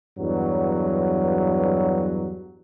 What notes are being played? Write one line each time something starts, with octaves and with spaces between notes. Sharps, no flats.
E2 G2 F#3